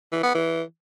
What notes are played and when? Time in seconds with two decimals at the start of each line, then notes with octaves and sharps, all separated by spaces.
0.12 E3
0.23 B3
0.35 E3